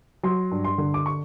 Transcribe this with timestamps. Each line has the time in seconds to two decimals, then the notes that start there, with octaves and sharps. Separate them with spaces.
0.23 F#3 C6
0.51 G2
0.65 C6
0.78 D3
0.94 D6
1.06 C#6